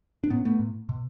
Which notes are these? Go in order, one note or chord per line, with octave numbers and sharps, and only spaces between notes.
D4
A2 B3 C#4
A3 B3
A2
B2